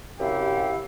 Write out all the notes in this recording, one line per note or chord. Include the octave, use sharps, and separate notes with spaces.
F#2 C3 E4 G4 F5